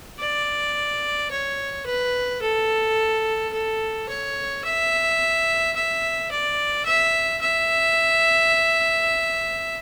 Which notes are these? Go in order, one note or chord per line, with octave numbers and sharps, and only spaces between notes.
D5
C#5
B4
A4
A4
C#5
E5
E5
D5
E5
E5